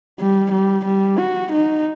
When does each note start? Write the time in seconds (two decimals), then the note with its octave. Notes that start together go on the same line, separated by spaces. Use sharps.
0.20 G3
0.52 G3
0.85 G3
1.18 F#4
1.53 D#4